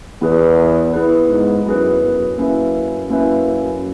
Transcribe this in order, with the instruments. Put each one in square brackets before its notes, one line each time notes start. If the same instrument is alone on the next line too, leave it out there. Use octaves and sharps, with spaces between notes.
[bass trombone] E2 [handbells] B3 E4 G#4 B4
[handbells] B3 E4 G#4 B4
[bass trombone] G#2
[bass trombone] F#2 [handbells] B3 E4 G#4 B4
[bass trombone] F#2
[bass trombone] F#2 [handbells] A#3 C#4 E4 B4 E5
[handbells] A#3 C#4 E4 B4 E5